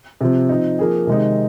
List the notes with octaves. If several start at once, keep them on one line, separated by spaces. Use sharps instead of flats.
C3 F3 C4
F3 C4 D#4
F3 A#3 G#4
C3 D#3 G#3 C4 D#4